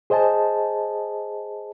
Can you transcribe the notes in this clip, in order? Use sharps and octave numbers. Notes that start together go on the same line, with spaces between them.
G#4 C5 D#5 G#5 A5